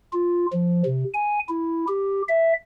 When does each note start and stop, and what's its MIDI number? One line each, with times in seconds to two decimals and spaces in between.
0.13 0.46 65
0.53 0.82 53
0.86 1.04 48
1.14 1.39 80
1.49 1.86 64
1.88 2.22 67
2.28 2.53 76